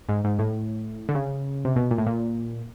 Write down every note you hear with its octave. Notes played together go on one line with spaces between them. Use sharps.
G#2
G#2
A2
D3
C#3
C3
B2
A#2
A2
A#2